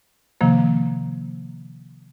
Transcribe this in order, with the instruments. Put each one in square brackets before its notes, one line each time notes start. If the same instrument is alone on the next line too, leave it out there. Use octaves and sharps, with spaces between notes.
[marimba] C3 D#3 F3 A#3